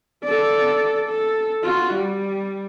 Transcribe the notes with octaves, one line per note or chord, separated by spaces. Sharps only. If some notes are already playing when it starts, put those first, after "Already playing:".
A4 D5
A4
F4 F#4
G3